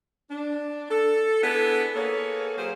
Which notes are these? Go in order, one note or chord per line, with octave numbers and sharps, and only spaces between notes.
D4
A4
B3 D4 E4 G#4 A4
A#3 B3 G#4 A4 C#5
F#3 A#3 G#4 C5